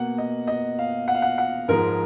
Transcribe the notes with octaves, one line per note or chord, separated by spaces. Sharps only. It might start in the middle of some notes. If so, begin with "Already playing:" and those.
Already playing: B2 A#3 F#5
D#5
D#5
F5
F#5
F5
F#5
F#5
G#2 F3 G#3 A#4